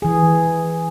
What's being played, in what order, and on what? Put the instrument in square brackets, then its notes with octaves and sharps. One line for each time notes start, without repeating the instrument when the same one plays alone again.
[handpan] E3 G#4 [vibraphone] G#5